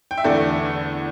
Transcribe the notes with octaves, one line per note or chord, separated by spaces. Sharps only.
G5
E5
E2 D3 A3 A4 D5